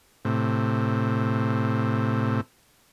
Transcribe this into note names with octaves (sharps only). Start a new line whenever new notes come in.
A2 C3